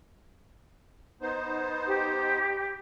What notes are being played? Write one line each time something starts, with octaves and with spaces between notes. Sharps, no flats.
B3 D#4 C5
G4